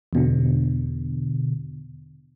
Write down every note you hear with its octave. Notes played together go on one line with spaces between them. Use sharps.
E2 B2 D3